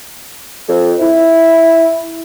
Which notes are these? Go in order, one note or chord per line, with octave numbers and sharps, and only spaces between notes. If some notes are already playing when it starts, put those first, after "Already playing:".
F2
E4